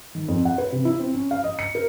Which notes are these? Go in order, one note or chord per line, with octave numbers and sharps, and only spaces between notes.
D#3
F2
F#5
B4
C3
E4
C4
C#4
F5
D#5
C#7
A#4